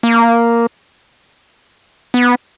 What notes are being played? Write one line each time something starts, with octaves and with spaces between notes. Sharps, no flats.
A#3
B3